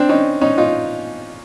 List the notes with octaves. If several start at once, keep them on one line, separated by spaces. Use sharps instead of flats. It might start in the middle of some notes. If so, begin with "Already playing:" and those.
Already playing: C4 D4
C#4 D#4
C#4 D#4
D#4 F4